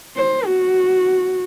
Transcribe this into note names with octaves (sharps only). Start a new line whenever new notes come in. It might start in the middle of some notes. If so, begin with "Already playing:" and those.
C5
F#4